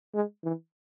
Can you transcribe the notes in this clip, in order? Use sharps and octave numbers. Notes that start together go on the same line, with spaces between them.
G#3
E3